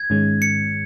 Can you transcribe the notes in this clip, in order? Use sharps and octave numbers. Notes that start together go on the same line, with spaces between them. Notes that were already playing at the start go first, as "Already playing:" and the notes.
Already playing: G#6
G#2 D#3 G#3 C#4
C#7